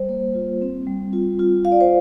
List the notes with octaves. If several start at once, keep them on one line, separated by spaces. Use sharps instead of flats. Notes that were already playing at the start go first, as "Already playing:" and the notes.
Already playing: G3 C5
A#3
F4
C4
G3
F4
F4
F4 F5
D5
C5